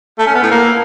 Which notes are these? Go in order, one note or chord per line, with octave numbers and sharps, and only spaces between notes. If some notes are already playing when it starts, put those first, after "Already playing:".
A3
C#4
B3
A2
A#3